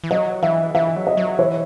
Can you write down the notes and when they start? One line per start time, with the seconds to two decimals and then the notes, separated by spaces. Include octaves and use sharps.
0.04 E3
0.11 F#3 D#5
0.42 E3 E5
0.75 E3 E5
0.96 F#3
1.07 D#5
1.17 F#3
1.38 E3 C#5